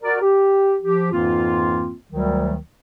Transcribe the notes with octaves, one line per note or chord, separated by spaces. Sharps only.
F#4 A#4 D5
G4
F3 G4
F2 G#2 E3 A#3 C4 F4
D2 D#3 F#3 G3